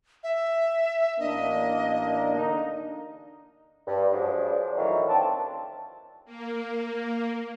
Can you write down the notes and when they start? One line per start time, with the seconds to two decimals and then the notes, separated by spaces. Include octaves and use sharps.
0.23 E5
1.19 A1 A#3 D4 D#5
2.36 D3 A#3 D#4
3.87 G2
4.12 F3 F#3 G#3 D4
4.77 A2 D#3 E3 F#3 D#4 F5
5.08 C#2 C4 D4 A5
6.25 A#3